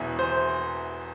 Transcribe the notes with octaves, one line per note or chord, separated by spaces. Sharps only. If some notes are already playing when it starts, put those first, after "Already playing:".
Already playing: E1 E2 E3
C5